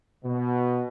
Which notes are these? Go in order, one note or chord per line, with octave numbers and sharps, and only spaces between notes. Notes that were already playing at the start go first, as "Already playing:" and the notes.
B2